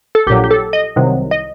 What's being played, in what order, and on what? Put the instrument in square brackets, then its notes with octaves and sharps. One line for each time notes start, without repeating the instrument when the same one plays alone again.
[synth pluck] A4
A#1 G4
A#2 F#3
G4
A4
D#5
C2 C3 D#3 F#3
D#5